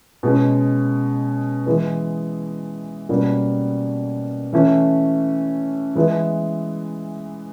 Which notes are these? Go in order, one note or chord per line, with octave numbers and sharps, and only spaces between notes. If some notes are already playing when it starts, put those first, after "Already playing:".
B2 G#3 C#4
E3 G#3 B3
B2 G3 A#3 C#4 F#4
E3 A3 C#4
E3 G#3 B3 E4